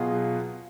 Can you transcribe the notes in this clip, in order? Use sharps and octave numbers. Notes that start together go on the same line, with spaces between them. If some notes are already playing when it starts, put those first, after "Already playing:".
Already playing: B2 F#3 B3 F4 G#4